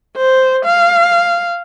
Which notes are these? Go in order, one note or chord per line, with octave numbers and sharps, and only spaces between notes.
C5
F5